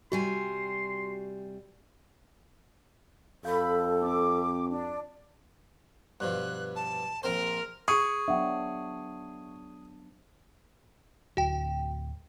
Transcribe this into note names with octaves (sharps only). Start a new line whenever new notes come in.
C3 G3 F#4 G#5 C6
F2 A4 F5 B5 G6
C4 D6
D4
G2 B2 F3 F#6
A5
A#1 C4 A#4 C5
G#4 C#6
F#3 B3 D4 E5 F#5 G5
D1 F#4 G5